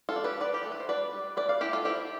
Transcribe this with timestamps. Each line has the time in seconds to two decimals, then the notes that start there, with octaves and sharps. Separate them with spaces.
0.09 F4 A4
0.16 D4
0.24 G4 B4
0.40 F3 B4 D5
0.54 G4
0.63 A3 A4
0.72 B4
0.80 C5
0.88 D4 B4 D5
1.13 G3
1.36 G3 B4 D5
1.49 D5 F5
1.60 D4 E4 G4
1.73 F4 A4
1.85 C4 E4 G4